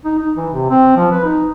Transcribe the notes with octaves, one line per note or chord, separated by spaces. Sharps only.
D#4
D#4
E3
C3
C4
F3
B4
D#4